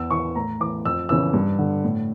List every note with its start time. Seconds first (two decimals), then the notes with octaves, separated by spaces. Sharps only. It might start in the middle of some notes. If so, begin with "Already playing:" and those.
Already playing: E2 E6
0.10 E3 C#6
0.35 A2 A#5
0.60 E3 D6
0.85 F2 E6
1.09 C#3 E3 E6
1.33 G2
1.59 D3
1.84 A2